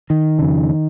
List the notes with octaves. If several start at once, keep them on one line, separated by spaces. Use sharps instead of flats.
D#3
F2 C#3